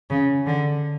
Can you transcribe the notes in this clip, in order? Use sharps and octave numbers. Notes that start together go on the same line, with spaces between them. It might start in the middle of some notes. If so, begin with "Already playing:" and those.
C#3
D3